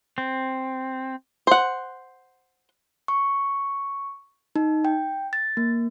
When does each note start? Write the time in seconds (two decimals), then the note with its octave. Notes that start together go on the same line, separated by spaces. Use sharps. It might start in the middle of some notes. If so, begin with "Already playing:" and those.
0.18 C4
1.47 C5 F#5
3.08 C#6
4.56 D#4
4.85 G5
5.33 A6
5.57 A#3